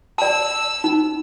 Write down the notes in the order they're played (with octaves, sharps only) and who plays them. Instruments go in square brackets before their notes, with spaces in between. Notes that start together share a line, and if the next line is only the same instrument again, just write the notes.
[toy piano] D5 A5 [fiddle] E6
[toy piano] D#4